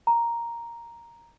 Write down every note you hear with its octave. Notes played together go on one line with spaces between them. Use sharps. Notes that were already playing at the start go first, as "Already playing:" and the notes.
A#5